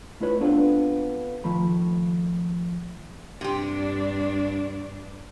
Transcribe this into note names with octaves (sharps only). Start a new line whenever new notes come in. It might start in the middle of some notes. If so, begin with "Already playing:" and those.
A3 E4 F4 B4 C#5
B3 C4 D4 F4 A4 C5
D#3 F3 A3 B5
G2 C3 D4 G4